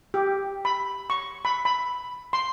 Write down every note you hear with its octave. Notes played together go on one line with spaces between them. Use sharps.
G4
B5
C#6
B5
B5
C6